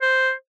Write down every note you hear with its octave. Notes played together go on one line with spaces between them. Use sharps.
C5